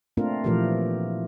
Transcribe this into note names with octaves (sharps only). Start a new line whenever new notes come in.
A3 A#3 C4 D4 F4 A#4
A#2 E3 F3 A3 G4 A#4